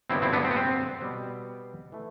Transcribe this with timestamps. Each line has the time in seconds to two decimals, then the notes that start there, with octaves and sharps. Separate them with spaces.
0.10 G2 D3 F#3 B3 C4 E4
0.22 C4 E4
0.33 B3 D4
0.44 C4
0.51 B3
0.56 C4
1.02 B2 G3 B3
1.92 E3 A3